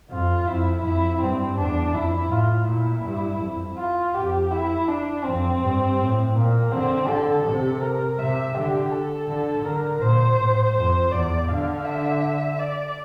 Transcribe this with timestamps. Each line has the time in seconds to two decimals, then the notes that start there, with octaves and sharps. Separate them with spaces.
0.11 F2 F4
0.47 F2 E4
0.84 F2 E4
1.21 G2 C4
1.58 E2 D4
1.94 F2 E4
2.31 A2 F4
2.68 A#2 E4
3.05 G2
3.42 F2
3.77 F4
4.14 F2 G4
4.52 E4
4.88 D4
5.24 F2 C4
5.61 G2
5.98 A2
6.35 A#2 A#3
6.71 D3 C4
7.07 D3 A4
7.44 C3 A4
7.81 A#4
8.18 C3 E5
8.54 D3 G4
8.92 A4
9.28 D3
9.64 D3 A#4
10.02 A#2 C5
10.38 A2
10.75 F2 C5
11.11 E2 D5
11.48 D3 F5
11.85 E5
12.58 D5